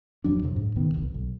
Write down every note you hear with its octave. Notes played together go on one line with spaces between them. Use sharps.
D1 F2 F#3 D4
F2 C3 F#3
G#2
C#2 B2 D#3 B3
D1 G1 C2
B1